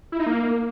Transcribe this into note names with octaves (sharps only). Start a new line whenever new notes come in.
E4
D#4
A#3